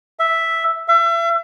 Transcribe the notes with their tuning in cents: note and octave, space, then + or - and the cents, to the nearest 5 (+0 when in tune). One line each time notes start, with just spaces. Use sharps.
E5 +0
E5 +35